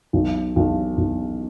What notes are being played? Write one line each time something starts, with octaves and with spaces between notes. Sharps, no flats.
B1
B1
B1